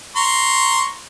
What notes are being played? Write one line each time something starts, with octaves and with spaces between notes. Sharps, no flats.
A#5 C6 C#6